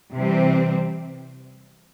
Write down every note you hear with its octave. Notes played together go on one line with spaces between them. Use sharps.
C3 E3 G3 C4